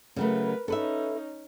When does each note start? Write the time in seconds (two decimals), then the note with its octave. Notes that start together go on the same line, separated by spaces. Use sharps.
0.16 C#3 F#3 A3 A#4 B4
0.68 C#4 D#4 A4 B4 E5